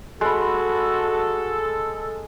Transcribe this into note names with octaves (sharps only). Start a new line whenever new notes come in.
G#3 F#4 A4 B5